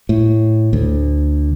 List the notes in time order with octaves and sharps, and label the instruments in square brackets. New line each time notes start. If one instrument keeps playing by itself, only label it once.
[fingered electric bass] A2
D2